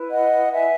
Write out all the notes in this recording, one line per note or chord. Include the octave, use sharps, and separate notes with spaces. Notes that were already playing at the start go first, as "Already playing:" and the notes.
Already playing: E4 B4
D#5 F#5
E5 G#5